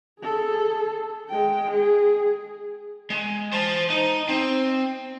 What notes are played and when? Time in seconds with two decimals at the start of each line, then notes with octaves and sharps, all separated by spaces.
0.20 G#4 A4
1.30 G#3 G5
1.71 G#4
3.10 G#3
3.53 C5 A5
3.90 D#4
4.29 C4